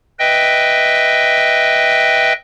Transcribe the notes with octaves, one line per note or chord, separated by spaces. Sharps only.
B4 D#5 E5 G5